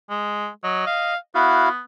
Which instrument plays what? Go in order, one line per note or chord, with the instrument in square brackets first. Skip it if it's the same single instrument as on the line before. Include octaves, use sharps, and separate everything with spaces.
[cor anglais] G#3
[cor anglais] F#3 [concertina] D#5
[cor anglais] F5
[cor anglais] B3 [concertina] E4 F#4 F5